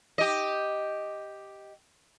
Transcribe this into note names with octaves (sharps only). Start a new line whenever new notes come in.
G4 D#5